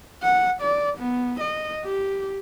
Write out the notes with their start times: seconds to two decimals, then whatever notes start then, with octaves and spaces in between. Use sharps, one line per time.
0.23 F#5
0.62 D5
0.98 B3
1.40 D#5
1.85 G4